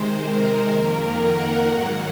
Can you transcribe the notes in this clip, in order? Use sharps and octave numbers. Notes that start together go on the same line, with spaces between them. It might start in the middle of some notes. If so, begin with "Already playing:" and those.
Already playing: C3 D#3 G#3 C5
A#4
F2 D#3 A#3
F#5
G#2 D#3 F#3 A#3